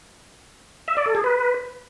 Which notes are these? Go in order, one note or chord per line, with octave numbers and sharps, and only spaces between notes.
E5
D5
A4
G#4
B4